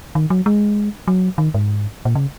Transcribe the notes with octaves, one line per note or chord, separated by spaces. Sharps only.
D#3
F#3
G#3
F#3
D#3
G#2
A#2
C#3